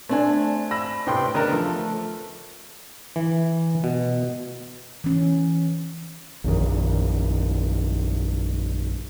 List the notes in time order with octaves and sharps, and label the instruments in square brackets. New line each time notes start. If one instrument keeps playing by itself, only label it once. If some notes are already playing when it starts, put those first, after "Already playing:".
[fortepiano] A3 [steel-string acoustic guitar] C4 D4 G#5
[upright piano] B5 E6 A#6
[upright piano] A2 C6 [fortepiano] C3 B3 G5
[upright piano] C#3 D4 D#4 [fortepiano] A#4 B4
[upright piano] F3 [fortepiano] A3 [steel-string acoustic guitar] A4
[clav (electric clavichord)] E3
B2
[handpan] E3 C#4
[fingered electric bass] A#1 F#2 D#3